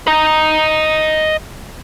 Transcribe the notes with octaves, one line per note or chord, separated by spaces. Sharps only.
D#5 A#5